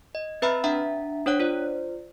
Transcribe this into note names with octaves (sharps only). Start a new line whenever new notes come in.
D#5
C4 B4 E5 A#5 B5 F6
D4 E5 F#5 A#5
D4 C5 C#5 F#5 F#6
F4 C5 D5